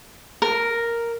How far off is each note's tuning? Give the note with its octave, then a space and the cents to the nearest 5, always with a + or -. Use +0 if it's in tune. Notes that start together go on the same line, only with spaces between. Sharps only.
A#4 +0